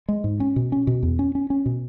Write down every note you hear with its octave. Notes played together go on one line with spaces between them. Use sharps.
G#3
G#2
C#4
B2
C#4
B2
E2
C#4
C#4
C#4
B2